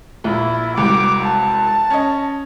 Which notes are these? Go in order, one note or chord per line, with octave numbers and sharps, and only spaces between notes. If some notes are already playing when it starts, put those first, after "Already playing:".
A#1 E4
E1 C2 D6
A5
C#4 D#5